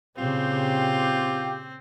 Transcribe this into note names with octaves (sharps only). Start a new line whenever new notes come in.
A#2 C#3 C4 F4 G4